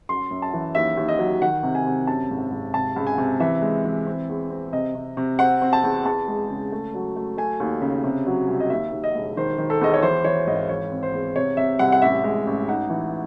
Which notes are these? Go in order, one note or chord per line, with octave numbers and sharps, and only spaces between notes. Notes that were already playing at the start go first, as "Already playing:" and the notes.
F#2 C6
F#2
A5
E3
D#2 E5
D#2
D#5
F#3
D#3 F#5
C3
G#5
C3
F#2 A5
G#1
G#1
C3 A5
C#2
G#5
C3
E3 E5
G#3
E3
C4
E2
C4
C3 D#5
C3
C3
C4 F#5
C4
A5
E2
E2 A5
G#3
C#3
A3
F#3
A3
A3 G#5
D#2
C#3
C3
F#3
C2
D#5
D#2 E5
D#2
D#5
E1
D#3 C5
D#3
A4
E2 D#5
C#5
E3 C5
E3 C#5
G#1 D#5
E3 C#5
C4
C5
E2
C3 C#5
C3 E5
C2 F#5
F#5
A1 E5
G#3
A1
D#4 F#5
E3